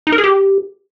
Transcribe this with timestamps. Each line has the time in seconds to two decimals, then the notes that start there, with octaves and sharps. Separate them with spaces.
0.07 D#4
0.12 A#4
0.18 G#4
0.24 G4